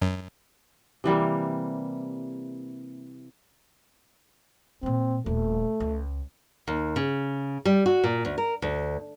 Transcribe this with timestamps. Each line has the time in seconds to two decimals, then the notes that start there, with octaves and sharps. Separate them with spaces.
0.02 F#2
1.04 C3 E3 G3 A#3
4.83 A#2 D#3 C4
5.26 D#1 A3
5.80 C#2
6.68 D#2
6.96 C#3
7.65 G3
7.86 F#4
8.04 A#2
8.25 D2
8.38 A#4
8.62 D2